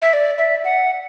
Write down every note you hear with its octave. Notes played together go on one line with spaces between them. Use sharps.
E5
D5
E5
F#5